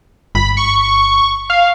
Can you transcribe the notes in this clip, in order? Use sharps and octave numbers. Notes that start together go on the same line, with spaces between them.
G1 B5
C#6
F5